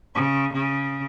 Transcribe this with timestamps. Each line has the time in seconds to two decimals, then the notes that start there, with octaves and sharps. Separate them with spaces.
0.15 C#3
0.53 C#3